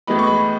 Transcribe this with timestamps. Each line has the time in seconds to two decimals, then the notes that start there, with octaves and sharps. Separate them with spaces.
0.07 A2 E3 G#3 B3 D#4 B5
0.19 C#6
0.27 B5